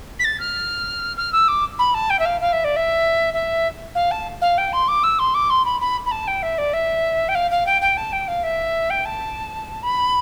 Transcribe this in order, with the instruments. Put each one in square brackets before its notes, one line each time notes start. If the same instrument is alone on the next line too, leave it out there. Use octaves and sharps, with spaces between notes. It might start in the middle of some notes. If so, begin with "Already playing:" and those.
[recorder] B6
A6
F6
F6
E6
D6
B5
A5
G5
E5
F5
F5
E5
D5
E5
E5
F5
A5
F5
G5
C6
D6
E6
C6
D6
C6
B5
B5
B5
A5
G5
E5
D5
E5
G5
F5
F5
G5
G5
A5
G5
F5
E5
G5
A5
B5